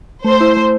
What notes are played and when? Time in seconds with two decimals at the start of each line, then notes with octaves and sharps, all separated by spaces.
0.24 A3 C5
0.41 E4
0.57 A3